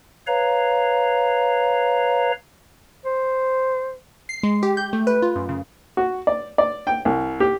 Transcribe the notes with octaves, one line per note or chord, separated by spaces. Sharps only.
B4 C#5 F5 A#5
C5
C7
G#3
G4
G6
A3
B4
F4
F#2
C#3
F#4
D5
D5
G5
C2
G4